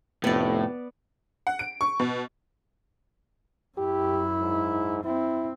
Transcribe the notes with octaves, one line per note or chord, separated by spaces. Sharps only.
F1 A2 B3 D5
F#5
D7
C#6
B2
F#2 E4 G4
G#2
C4 E4